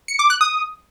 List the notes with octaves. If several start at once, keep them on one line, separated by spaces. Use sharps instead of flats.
C#7
D6
F#6
D#6